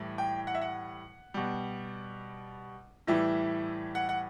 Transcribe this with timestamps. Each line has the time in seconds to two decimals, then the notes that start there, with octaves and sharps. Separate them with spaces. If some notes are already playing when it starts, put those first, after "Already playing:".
Already playing: A2 E3 G3
0.18 G5
0.47 F#5
0.55 E5
0.62 F#5
1.34 B2 G3
3.07 A2 E3 G3 E5
3.95 F#5
4.09 F#5